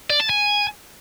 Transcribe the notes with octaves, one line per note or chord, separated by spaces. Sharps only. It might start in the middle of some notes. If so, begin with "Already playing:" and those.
D5
A5
G#5